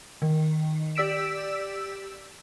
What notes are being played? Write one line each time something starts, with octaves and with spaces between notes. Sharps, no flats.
D#3
G4 D5 E6 B6 D7 E7